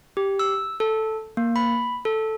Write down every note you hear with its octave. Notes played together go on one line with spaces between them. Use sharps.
G4
E6
A4
A#3
B5
A4